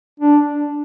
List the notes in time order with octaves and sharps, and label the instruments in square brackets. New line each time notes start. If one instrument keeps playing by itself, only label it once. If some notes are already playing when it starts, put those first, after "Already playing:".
[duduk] D4